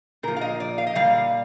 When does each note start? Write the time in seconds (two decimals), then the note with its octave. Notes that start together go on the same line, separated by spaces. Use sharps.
0.23 A#2 F3 A#4
0.36 F5
0.41 D#5
0.60 D5
0.78 F5
0.87 D#5
0.95 A#2 G3 F5